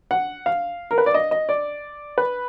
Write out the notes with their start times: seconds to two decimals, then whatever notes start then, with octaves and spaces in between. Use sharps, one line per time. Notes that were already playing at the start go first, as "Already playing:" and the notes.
0.11 F#5
0.46 F5
0.91 A#4
0.98 B4
1.06 D5
1.14 D#5
1.31 D#5
1.49 D5
2.18 B4